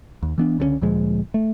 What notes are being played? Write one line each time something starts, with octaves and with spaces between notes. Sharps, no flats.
D#2
E3 B3 D4
C#2 D3 G3 C#4
D2 A#2 F3 G#3
A3